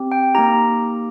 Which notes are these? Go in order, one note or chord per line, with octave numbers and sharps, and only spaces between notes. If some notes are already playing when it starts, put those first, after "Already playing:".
Already playing: C4 G4
G5
A#3 D#4 G4 A#5